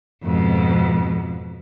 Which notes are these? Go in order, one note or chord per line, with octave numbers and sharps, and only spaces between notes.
F2 G#2 B2